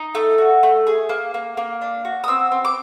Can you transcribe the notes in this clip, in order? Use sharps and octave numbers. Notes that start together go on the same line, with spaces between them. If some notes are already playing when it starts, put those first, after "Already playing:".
Already playing: D#4
A3
F#4
A3
G#4
A#3
A#3
A#3
D4
F#4
D#6
C4 E6
C4
D6